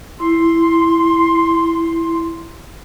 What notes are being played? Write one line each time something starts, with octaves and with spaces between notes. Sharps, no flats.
E4 C6